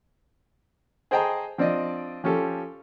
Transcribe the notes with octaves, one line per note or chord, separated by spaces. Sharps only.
G#4 C5 D#5 G5 A5 A#5
F3 C4 D4 D5 D#5
F3 C#4 G4 A4